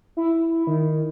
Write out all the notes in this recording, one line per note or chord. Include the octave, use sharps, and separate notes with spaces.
E4
D#3